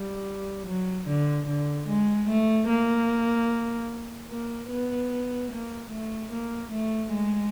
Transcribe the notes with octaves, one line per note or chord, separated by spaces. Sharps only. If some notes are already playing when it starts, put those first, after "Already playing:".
Already playing: G3
F#3
D3
D3
G#3
A3
A#3
A#3
B3
A#3
A3
A#3
A3
G#3